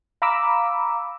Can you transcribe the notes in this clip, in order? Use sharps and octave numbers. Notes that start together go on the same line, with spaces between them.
F5 A#5 B5 D6 E6